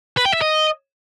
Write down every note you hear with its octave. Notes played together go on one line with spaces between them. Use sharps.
B4
G5
E5
D#5